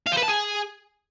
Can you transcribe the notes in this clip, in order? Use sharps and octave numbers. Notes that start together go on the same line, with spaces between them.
F5
C5
B4
A5
G#4